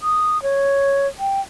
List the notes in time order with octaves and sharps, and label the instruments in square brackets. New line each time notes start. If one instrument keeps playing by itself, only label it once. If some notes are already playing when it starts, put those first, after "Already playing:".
[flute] D#6
C#5
G5